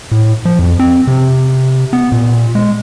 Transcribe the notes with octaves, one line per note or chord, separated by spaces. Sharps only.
A2
F3
F2
C4
C3
B3
A#2
G#3